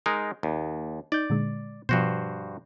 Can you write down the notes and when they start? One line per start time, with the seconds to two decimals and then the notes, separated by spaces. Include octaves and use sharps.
0.06 G#3 D#4 A#4
0.43 D#2
1.12 D#4 D5 G6
1.30 A#2 D3 G#3
1.89 G2 B2 F3 F#4 C5